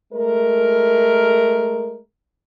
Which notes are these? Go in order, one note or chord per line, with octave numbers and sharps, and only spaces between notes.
G#3 A3 A#4